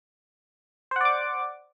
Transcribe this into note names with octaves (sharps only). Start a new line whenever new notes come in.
C5 D5 F#5 D6